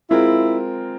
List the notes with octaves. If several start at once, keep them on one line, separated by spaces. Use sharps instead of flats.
G#3 C4 E4 F4 A#4